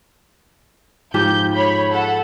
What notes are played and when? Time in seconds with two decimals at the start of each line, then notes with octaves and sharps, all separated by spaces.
1.14 G#2 F3 G4 G6
1.53 C#5 B5
1.92 A4 F#5